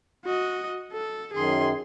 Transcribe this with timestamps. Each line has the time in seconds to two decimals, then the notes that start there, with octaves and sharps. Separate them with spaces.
0.25 F#4 D#5
0.93 A4
1.34 F#2 D#3 G#4 C6